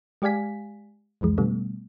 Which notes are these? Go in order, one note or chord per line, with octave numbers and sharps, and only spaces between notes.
G#3 G4 D5 F5 G#5 B6
C2 F2 E3 G#3
B2 D3 G3 A3 B3